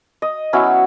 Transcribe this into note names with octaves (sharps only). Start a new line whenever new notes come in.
D#5
F#3 B3 C#4 E4